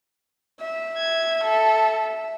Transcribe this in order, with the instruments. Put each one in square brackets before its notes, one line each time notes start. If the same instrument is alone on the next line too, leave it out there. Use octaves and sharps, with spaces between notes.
[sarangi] E5
[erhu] G#6
A4